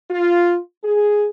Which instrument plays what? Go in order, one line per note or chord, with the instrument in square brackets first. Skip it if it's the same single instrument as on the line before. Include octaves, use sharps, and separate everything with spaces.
[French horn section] F4
G#4